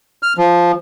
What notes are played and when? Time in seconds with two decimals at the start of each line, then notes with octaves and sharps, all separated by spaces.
0.23 F6
0.37 F3